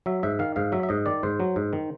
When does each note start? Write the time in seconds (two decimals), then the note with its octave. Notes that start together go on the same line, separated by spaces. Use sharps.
0.06 F#3 E5
0.23 G#2 E5
0.39 D#3 F5
0.56 G#2 F5
0.72 F#3 E5
0.83 E5
0.89 G#2 D#5
1.06 D#3 D5
1.23 G#2 C5
1.40 F#3
1.56 G#2
1.73 D#3